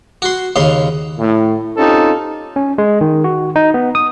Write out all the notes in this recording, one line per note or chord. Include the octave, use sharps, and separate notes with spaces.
F#4 C6
D#2 C#3 C6
A2
C4 C#4 D#4 F4 G4 A4
C#4
G#3
D#3
F#4
D#4
B3
D#6